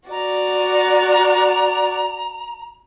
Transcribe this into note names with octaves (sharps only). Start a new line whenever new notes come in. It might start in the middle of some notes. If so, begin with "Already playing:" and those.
F#4 D5 A#5